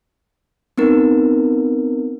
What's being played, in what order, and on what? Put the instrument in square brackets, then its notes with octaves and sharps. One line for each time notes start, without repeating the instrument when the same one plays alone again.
[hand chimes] B3 C4 D#4 A#4